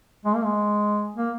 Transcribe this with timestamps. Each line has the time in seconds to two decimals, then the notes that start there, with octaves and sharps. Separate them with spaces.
0.25 G#3
0.35 A#3
0.45 G#3
1.17 A#3